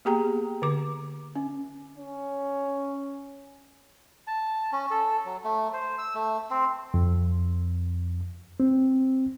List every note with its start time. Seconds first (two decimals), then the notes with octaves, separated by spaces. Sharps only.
0.05 A#3 B3 G4 G#4 G5 A#5
0.62 D3 D6
1.36 C#4
1.98 C#4
4.27 A5
4.72 C#4
4.91 A4
5.25 F#3
5.44 A3
5.73 C5
5.99 E6
6.15 A3
6.51 C4
6.94 F2
8.60 C4